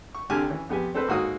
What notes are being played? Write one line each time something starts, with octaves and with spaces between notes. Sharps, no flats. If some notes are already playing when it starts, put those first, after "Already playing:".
C#6
C2 D3 G4 G#5 A5 F6
E3 C#4
F2 B3 G4 G#5
C4 A4 B4 C5
G#2 A#3 F#4 A4 C#5 D#6